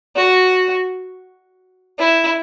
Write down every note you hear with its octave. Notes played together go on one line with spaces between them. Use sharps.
F#4
E4